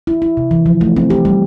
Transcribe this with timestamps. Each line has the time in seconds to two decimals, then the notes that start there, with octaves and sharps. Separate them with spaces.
0.07 E4
0.22 E4
0.37 C3
0.51 E3
0.66 F3
0.81 A3
0.97 C4
1.10 G4
1.25 G3